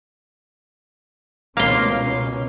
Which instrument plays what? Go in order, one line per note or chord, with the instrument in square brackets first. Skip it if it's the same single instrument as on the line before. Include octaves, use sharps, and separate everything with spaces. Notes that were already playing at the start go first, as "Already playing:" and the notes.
[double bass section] C#2 B2 C#4 [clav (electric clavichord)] A#3 [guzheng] F5 C6